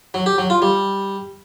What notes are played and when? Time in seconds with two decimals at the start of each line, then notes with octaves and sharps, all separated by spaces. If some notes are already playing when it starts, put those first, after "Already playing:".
0.14 F#3
0.26 G4
0.38 F#3
0.50 F4
0.62 G3